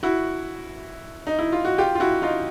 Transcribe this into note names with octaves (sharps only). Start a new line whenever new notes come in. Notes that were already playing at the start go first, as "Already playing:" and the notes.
E4 F#4
D#4
E4
F4
F#4
F4 G4
F4
E4 F#4
D#4 F4